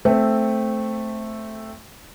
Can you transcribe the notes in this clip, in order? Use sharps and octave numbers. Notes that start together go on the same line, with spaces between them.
A3 C4 E5